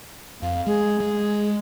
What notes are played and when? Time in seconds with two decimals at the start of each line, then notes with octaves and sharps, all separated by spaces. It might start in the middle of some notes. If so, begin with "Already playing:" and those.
0.42 F2 F5
0.66 G#3 G#4
1.00 G#3